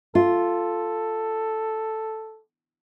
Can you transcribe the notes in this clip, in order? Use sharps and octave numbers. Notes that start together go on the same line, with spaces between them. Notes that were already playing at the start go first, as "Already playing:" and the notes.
F4 A4